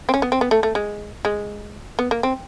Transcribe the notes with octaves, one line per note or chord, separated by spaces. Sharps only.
C4
C#4
B3
C4
B3
A3
A3
G#3
G#3
B3
A#3
C4